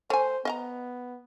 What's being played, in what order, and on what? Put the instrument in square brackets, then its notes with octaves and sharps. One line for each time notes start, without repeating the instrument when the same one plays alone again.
[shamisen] A3 G#5 [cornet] C5
[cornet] B3 [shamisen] D#5 F5 A#5